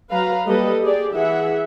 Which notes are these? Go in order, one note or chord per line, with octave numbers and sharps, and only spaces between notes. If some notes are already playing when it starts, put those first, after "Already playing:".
F#3 B4 F5 A#5
G3 A#3 G4 A4 B4 D#5
G4 G#4 D5
E3 G#4 E5 F#5